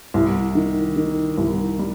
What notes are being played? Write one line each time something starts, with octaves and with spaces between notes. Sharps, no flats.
C2
D#3
D#3
C2
G3